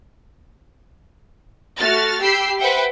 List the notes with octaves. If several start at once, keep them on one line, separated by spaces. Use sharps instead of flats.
A3 F#4 F6 A6
G4 G5 B5 E6 C7
B4 C5 E5 F#5 G5